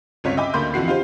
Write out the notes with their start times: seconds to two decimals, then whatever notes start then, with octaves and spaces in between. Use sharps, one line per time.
0.24 G1 C#2 C4 F4 C#5 B6
0.37 D#5 E5 G5 G#5 B5 D6
0.54 D2 D3 A#3 B5 C6 G6
0.74 F2 D3 E3 F#4 C7
0.87 D#4 F4 G4 C5